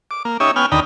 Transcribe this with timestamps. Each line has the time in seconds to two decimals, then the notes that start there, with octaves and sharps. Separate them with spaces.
0.11 D6
0.25 A#3
0.40 C#4 D#4 G4 C#5 E5
0.56 B3 C#4 G5 G#5 F6
0.72 D#2 D3 D#4 G5 A#5 B5